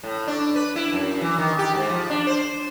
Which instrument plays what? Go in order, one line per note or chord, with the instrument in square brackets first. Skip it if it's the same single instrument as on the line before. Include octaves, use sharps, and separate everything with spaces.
[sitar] A2
D4
B4
E4
F#2
E3
D#3
G4
G#2
F3
D4
C5